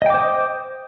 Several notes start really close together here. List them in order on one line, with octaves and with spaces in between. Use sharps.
D#5 G5 D6 C5 D#6